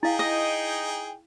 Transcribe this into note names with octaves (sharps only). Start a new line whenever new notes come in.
D#4 E4 G#4 F5 G5
D#5